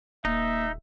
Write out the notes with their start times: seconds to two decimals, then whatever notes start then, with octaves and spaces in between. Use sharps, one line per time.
0.25 D#1 A#3 D#4 E5